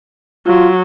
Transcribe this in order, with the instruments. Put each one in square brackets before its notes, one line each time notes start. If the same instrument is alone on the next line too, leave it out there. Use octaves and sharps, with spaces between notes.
[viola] F#3 [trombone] F4